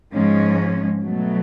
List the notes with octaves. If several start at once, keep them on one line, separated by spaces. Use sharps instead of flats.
G#2 F3 G#3 C#4
B2 F#3 A3